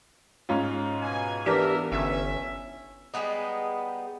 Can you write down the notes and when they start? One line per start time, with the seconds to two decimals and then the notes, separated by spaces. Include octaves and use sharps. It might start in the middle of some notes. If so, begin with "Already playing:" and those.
0.49 G#2 C#4 F4
1.01 B2 G#5
1.46 E3 B3 D4 G4 A#4 E5
1.92 G1 C#4 E5
3.14 G3 G#3 B3 D#4